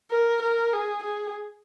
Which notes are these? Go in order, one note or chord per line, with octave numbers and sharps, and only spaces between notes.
A#4
A#4
G#4
G#4